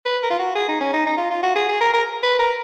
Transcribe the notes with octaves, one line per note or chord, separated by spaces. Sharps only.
B4
A#4
F4
F#4
G#4
D#4
C#4
D#4
D#4
F4
F4
F#4
G#4
G#4
A#4
A#4
B4
A#4